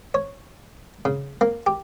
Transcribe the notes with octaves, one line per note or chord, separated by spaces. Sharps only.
C#5
C#3
A#3
G4